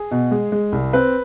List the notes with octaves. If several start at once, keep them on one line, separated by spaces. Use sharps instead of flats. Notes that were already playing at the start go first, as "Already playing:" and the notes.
Already playing: G#4
B2
G#3
G#3
C2
C4 B4